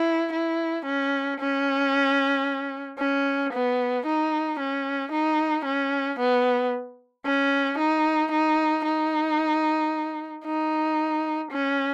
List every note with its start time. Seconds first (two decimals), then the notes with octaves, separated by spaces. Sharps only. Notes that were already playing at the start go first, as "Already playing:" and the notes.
Already playing: E4
0.33 E4
0.85 C#4
1.40 C#4
2.99 C#4
3.53 B3
4.06 D#4
4.60 C#4
5.12 D#4
5.65 C#4
6.19 B3
7.26 C#4
7.78 D#4
8.32 D#4
8.85 D#4
10.45 D#4
11.51 C#4